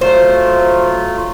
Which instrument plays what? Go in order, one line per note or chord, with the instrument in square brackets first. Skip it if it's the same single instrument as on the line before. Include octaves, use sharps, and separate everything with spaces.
[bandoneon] F#3 A3 F4 [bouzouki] C5